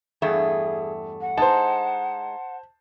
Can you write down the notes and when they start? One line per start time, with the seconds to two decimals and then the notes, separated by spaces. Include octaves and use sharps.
0.22 E2 G2 A3 G#4
1.21 F#5
1.38 G#3 D#4 C5 A5